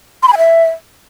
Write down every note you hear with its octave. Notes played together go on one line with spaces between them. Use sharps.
C6
B5
G#5
E5